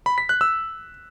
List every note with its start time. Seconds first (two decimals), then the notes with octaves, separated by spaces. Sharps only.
0.06 B5
0.18 B6
0.29 F#6
0.41 E6